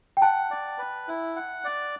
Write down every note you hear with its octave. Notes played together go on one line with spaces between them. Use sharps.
G5
F#5 A5
D5
B4
E4
F#5
D5